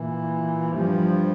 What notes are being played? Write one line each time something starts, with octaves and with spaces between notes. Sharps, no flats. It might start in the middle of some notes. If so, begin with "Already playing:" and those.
Already playing: A#2 E3
G2 F3